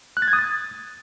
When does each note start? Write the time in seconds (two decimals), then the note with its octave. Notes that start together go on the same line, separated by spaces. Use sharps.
0.17 F#6
0.22 A6
0.28 G#6
0.33 D#6
0.39 A6